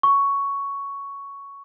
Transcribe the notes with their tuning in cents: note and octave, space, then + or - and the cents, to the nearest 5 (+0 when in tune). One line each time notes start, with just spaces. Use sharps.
C#6 +10